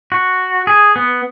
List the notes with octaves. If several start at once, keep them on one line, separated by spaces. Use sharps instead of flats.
F#4
G#4
B3